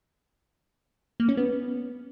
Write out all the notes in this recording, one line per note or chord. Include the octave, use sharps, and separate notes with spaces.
A#3
C#4
B3